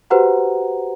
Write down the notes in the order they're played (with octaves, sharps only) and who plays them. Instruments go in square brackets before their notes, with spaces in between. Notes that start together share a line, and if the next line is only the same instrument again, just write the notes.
[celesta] F#4 G4 B4 C5 F#5 A#5